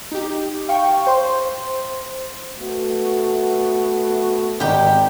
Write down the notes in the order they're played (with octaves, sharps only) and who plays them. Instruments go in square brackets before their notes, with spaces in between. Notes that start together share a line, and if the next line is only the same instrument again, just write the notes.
[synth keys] D#4 G4
F5 G5 C#6
C5 C6
[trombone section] A3 B3 F#4
[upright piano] G#1 D#4 [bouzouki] G4 G5